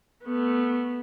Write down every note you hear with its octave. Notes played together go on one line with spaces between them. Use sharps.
A3 B3